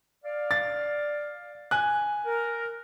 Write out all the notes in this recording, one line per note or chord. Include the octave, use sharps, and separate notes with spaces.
D5 F5
A6
G#5 F#6
A#4